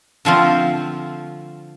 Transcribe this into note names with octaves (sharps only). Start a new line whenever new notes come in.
D3 F3 A3 C4 F4